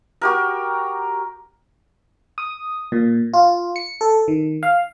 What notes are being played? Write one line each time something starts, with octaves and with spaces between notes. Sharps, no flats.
F#4 G4 A#4
D#6
A#2
F4
C#7
A4
D#3
F5